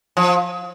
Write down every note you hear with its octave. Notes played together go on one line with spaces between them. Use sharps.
F3